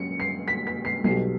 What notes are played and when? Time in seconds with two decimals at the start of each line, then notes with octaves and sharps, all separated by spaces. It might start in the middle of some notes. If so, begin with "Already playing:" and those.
Already playing: F#2 C#7
0.20 C7
0.48 B6
0.67 B6
0.85 C7
1.04 B1 B2 G3 C7